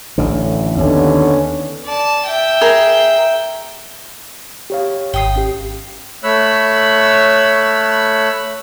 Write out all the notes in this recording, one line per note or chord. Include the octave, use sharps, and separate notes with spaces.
A1 D3
D#2 D3 B3 C#4
D5 A5
E5 G5
G#4 A#4
G4 C#5 F5
G#1 G5 D#6 C7
C#4 G4
A3 C#5 B5 E6 F#6